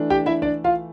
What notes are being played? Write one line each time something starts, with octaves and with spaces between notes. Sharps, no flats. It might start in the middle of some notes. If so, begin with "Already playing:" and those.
Already playing: E3 A3 D4
G4 G5
E4 E5
D4 D5
F4 F5